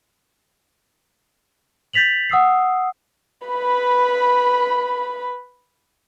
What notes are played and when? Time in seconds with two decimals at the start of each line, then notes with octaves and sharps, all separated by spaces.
1.93 G6 A6 B6 F7 F#7
2.30 F#5 D#6 E6 C7
3.48 B4 B5